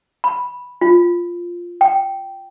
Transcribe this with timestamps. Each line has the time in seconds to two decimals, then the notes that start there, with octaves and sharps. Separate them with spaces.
0.24 B5
0.81 F4
1.81 G5